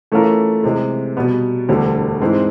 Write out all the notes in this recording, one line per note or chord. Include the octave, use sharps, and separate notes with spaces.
E3 A3 C#4 F4 A#4
C3 E3 G#3
B2 G3 B3
E1 D2 D3 G3
G#2 E3 G#3 C4